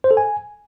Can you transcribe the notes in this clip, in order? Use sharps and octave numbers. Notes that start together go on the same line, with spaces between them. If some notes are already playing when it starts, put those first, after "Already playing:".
C5
A4
G#5